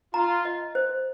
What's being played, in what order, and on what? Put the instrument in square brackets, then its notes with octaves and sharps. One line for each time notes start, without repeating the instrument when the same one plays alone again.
[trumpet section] F4 [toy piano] A#5
[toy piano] D#5
C5